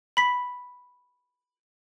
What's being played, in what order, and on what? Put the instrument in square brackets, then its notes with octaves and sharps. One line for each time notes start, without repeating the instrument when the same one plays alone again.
[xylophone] B5 B6